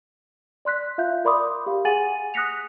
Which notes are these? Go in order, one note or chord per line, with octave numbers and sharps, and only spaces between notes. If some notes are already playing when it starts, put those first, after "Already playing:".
D5 C6 F#6 B6
F4 E5 F5 G6
A#4 D5 B5 C6 D6 D#6
G4 F5
G#4 F#5 G#5 A6 D#7 F#7
D#6 F#6 A#6 B6 C#7 F7